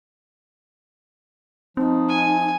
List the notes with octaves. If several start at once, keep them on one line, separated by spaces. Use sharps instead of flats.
F3 C4 D#4
G#5